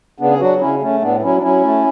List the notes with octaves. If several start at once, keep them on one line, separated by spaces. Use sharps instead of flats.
C#3 B3 D4
G#4
F#3 D4 F#4
C#3 C#4 E4
A3 C#4
A2 B3 D4
F#3 C#4 E4
D4
F#3 C#4 E4
A3